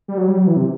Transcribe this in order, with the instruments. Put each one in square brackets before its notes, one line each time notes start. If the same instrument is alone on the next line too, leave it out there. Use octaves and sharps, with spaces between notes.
[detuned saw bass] G3
F#3
G3
F#3
E3
C3